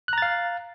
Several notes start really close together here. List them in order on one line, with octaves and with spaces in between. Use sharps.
F#6 A#5 A6 F5